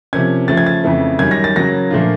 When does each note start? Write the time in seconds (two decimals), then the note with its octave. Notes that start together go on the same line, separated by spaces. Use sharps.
0.13 C3 F3 A#3 C#4 G#6
0.48 C#3 F3 A3 A6
0.57 G#6
0.66 A6
0.84 F2 C#3 E3 A3
1.19 F#2 D#3 G3 G#6
1.31 A#6
1.44 A6
1.55 C#3 F#3 A#3 A#6
1.91 A#2 F3 A3 D4 F4